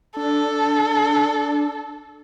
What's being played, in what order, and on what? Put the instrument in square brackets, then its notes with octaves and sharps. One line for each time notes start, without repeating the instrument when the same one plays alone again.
[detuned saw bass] D4 [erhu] A4